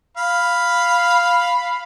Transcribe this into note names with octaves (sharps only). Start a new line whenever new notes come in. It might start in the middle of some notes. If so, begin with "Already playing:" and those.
F5 B5